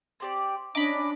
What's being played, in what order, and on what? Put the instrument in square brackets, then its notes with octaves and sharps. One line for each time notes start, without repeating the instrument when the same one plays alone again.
[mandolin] C4 G4 D5
[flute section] C#4 D4 [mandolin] D#5 G#5 A#5 [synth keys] B5 D6